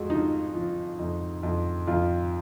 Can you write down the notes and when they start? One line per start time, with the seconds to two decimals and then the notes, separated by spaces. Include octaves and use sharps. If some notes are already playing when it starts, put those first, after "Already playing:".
Already playing: F2 G#3 F#4
0.10 F3 D#4
0.55 F3
0.99 F2
1.43 F2
1.87 F2 F4